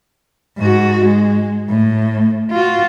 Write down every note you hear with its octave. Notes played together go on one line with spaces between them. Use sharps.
G#2 F#4
G#3
A2
F4 F#4